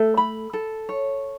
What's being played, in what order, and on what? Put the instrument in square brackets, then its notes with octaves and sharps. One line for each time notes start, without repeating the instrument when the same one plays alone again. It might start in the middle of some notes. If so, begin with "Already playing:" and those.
Already playing: [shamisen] A3 [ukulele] A4
[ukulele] B5
A4
C#5